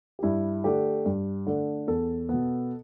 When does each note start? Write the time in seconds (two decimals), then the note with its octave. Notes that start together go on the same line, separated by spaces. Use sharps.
0.19 G4
0.23 G2 E4
0.64 D3 A3 D4 G4
1.05 G2
1.46 D3 A3 D4
1.87 E2 A4
2.29 B2 B3